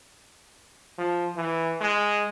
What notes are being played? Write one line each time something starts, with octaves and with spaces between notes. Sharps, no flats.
F3
E3
G#3